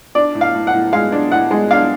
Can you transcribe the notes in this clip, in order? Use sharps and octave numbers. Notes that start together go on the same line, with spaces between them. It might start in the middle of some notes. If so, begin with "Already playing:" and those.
D4 D5
A2
F5
A2
F#5
A2
G#3 F5
D4
A2 F#5
G#3
D4 F5